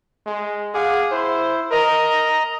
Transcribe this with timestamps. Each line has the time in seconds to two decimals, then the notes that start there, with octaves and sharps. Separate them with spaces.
0.26 G#3
0.74 G#4 F5 F#5 D6
1.11 E4 C5
1.72 A#4 D#5 A#5